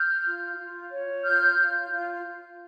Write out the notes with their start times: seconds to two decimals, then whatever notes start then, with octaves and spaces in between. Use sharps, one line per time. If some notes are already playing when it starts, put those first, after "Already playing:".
Already playing: F6 G6
0.23 F4
0.56 F4
0.90 C#5
1.23 F4 F6 G6
1.57 F4
1.91 F4